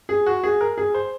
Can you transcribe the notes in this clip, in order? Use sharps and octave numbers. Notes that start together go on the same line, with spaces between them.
G#4
F#4
G#4
A#4
G#4
C5